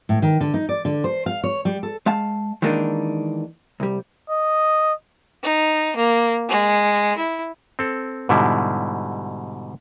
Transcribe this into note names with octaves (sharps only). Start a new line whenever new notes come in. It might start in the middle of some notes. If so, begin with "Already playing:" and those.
A2
D#3
D3
D#4
D5
D3
C5
F5
C#5
G3
A4
G#3 F5 A5
D#3 E3 G#3 A#3 D4 D#4
C2 G3
D#5
D#4
A#3
G#3
E4
C4 A4
G#2 B2 D3 G3 E4